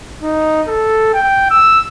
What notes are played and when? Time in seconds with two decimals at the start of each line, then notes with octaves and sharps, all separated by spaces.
0.23 D#4
0.67 A4
1.14 G5
1.51 E6